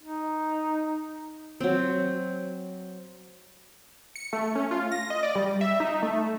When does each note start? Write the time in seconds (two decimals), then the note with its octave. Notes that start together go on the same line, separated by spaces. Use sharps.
0.03 D#4
1.61 F#3 C4
4.16 C#7
4.33 A3
4.55 C#4
4.71 F4
4.92 A#6
5.10 D#5
5.23 D5
5.35 G3
5.61 E5
5.80 D#4
6.03 A3